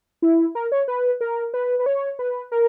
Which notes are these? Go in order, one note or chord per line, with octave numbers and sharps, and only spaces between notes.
E4
A#4
C#5
B4
A#4
B4
B4
C#5
B4
A#4